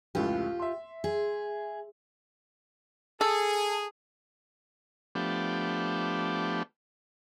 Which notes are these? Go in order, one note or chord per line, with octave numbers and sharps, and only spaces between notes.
F1 C#2 A2 F4 G4
E5 C6
G#4
G#4 A4
F3 A3 B3 D4 G4